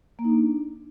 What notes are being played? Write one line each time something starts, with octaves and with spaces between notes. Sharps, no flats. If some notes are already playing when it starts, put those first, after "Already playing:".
A#3
D#4
D4